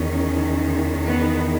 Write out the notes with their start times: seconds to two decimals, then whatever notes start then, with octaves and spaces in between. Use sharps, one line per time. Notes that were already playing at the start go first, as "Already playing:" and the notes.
Already playing: E2 D#3 C#4
1.05 B3